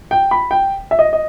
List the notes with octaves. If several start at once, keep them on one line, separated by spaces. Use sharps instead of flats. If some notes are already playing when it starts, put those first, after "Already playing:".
G5
B5
G5
E5
D#5
D#5